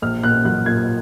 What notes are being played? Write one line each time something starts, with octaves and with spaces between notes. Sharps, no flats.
A#1 F6
A#2 F#6
F#3 F#6
A#2 G#6